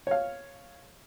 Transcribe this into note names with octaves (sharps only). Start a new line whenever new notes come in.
C#5 F5